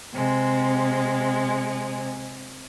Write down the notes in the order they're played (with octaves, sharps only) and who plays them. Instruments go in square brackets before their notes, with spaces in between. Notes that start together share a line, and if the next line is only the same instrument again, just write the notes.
[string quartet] C3 G#3